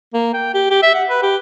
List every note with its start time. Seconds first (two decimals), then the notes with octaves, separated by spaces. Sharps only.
0.14 A#3
0.34 G5
0.54 G4
0.70 G4
0.83 E5
0.94 F#5
1.09 B4
1.23 G4